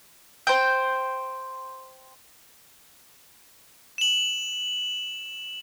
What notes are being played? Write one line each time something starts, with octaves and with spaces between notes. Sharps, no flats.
C5 G5
E7 F#7